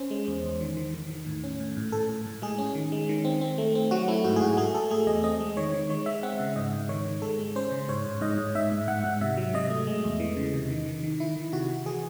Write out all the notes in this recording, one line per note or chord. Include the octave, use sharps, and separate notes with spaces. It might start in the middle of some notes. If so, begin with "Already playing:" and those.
Already playing: C#4 C5
G#3
E2
E2
D#3
D#3
D#3
D#3
A2
C#4
A2
A2
A2 A4
A2
A2
G#3 G#4
C#4
D#3
G#3
D#3
C4
C4
A3
C4
F#3 F#4
A3 E4
G#2 F#4
G#4
G#2 F#4
A3 G#4
A3 A4
A3 G#4
E2 D#5
C4 D#5
G#3
D#3 C#5
D#3
G#3 C#5
G#3 E5
C4 F#5
C#3 E5
G#2 D#5
G#2
D#3 C#5
D#3
G#3 A4
G#3
C#4 C5
C#3
G#2 C#5
G#2
G#2 D#5
G#2
G#2 E5
G#2
G#2 F#5
G#2
C3 E5
F#3
C3 D#5
A3
G#3
E2
E3
C#3
C3
D#3
D#3
D#3
D#3 E4
D#3
C3 F#4
C3
E3 G#4